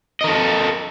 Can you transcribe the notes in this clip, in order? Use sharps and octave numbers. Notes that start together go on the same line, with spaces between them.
A4 A#4 D#5